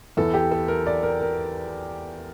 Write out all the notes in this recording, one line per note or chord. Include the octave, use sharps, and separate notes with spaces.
E2 E3 A4
G4
A4
A#4
D5
A#4
A#4